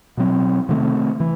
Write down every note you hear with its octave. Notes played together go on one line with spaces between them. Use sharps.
B2 F#3 C4
C3 D#3 A3 C4
E3